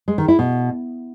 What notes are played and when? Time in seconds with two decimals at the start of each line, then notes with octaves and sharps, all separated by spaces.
0.08 G#3
0.18 D#3
0.28 E4
0.39 B2